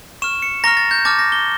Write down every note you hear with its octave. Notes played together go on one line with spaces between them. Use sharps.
C#6 F6 E7
C#7
A#5 C#6 F6 A#6
A6
G6
A5 D6 F6 A6
A#6
G7